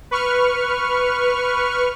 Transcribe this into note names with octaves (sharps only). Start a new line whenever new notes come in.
B4 C#6 F6